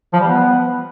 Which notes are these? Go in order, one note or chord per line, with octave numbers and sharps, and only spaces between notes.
F3
G3
B3